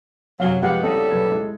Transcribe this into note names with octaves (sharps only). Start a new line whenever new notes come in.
F#2 C3 F#3 F5 G#5 G7
F3 G#3 B3 F#4 G4 F5 F#5
D#2 C#3 G3 C4 E4 A4 D#5
B1 B4 G#6
G#3 E4